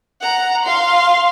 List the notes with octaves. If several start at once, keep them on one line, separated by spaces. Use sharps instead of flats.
F#5 A#5
F5 C6